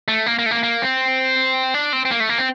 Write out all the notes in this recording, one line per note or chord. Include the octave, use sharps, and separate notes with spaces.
A3
A#3
A#3
A3
A#3
A#3
C4
D4
C4
C4
A#3
A3
A#3
C4